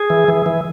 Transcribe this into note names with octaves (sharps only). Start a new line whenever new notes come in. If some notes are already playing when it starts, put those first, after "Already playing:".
Already playing: G#4
E3
E3
E3